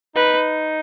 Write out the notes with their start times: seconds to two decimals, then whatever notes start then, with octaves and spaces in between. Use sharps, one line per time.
0.16 D#4 B4